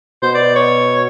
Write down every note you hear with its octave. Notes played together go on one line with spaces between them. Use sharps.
B2 C5
D5
C#5